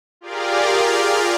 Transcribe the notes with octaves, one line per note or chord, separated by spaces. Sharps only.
F4 G4 G#4 A#4 D5 F5